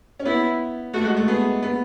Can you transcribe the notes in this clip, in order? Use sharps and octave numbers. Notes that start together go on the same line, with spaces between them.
C#4
B3 E4
A3 F#4
G#3
A3
B3 G#4
B3